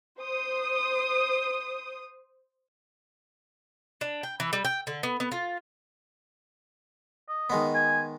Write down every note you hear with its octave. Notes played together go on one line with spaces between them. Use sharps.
C5 D#6
D4
G5
E3
G3
G5
D3
B3
B3
F4
D#5
D#3 G#3 B3
G#5